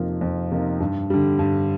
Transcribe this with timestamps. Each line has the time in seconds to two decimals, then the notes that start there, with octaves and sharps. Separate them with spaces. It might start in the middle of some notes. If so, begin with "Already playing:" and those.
Already playing: F2 C3 F3 A#3 D#4
0.21 F2
0.51 C3 F3 A#3 D#4
0.80 G2
1.10 D3 G3
1.39 G2